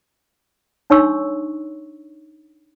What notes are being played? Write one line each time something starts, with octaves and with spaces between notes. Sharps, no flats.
D4 D#4 C#5 C6 C#6 E6